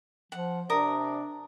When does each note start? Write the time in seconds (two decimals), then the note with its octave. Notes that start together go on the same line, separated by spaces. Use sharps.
0.32 F3 F#5
0.70 C3 D4 A#4 D5 D#6